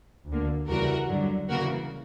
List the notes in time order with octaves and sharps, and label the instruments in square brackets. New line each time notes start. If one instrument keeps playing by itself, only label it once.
[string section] D2 D3 A#3
[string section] E2 C#3 E3 G3 [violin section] F#4 A#4
[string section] G2 D3 F#3
[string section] C#3 E3 A#3 [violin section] F#4 A#4